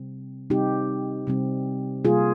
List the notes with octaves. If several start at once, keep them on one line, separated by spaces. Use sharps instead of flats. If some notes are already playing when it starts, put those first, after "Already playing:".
Already playing: C3 G3 C4
C3 G3 C4 D#4 G4
C3 G3 C4
C3 G3 A#3 F4 G#4